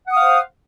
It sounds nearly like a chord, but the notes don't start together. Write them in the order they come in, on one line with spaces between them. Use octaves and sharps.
F#5 D#6 F5 C5